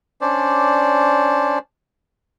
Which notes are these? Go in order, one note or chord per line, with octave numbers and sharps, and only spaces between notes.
C#4 D4 C5 D5